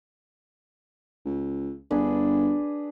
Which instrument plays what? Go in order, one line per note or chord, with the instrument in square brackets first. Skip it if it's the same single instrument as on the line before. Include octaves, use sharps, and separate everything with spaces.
[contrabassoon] C#2
[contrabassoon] G1 [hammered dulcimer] D4 G#4 B4